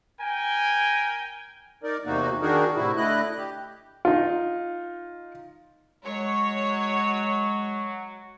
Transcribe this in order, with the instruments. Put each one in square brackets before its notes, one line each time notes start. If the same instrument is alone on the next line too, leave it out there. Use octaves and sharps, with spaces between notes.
[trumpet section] A#4 G5 G#5
[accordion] D#4 A#4 D5
E2 C3 A#3 D#4 F#4
D#3 D4 D#4 F#4 G#4 A#4
A2 C3 E4 F#4
D3 A3 E4 D#5 F#6
G4
[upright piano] D#4 F4
[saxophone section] F#3 [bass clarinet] G#3 [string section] C#5